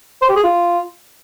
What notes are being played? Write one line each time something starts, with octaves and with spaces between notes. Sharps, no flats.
C5
G4
G#4
F4